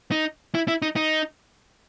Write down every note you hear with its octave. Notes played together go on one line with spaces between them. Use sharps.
D#4
E4
E4
D#4
D#4